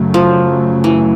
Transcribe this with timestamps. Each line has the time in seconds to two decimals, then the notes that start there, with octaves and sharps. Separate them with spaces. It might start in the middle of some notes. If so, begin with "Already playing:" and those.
Already playing: F#2 C#3 F#3 A3
0.14 F3
0.84 E3